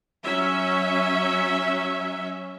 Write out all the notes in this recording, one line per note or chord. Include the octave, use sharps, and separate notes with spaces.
F#3 C#4 E5